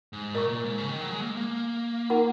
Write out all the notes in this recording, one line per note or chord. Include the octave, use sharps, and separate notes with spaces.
G#2
A#2 A#4 D#5 A#5 C#6
A#2
G#2
C#3
D#3
F#3
G#3
A#3
G#3
A#3
D#4 A#4 F#5 A#5